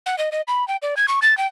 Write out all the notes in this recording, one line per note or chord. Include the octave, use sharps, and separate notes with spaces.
F#5
D#5
D#5
B5
G5
D5
G#6
C#6
A6
G5